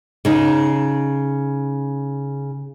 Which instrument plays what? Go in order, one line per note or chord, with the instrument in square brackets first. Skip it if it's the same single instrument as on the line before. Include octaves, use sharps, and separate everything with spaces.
[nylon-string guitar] C#3 D#4